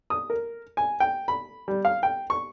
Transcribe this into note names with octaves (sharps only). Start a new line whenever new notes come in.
D#6
A#4
G#5
G5
B5
G3
F5
G5
C#6